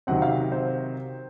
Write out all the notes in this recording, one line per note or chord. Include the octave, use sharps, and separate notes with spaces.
C3 D#3 F#3 C4 F#5
F5
C5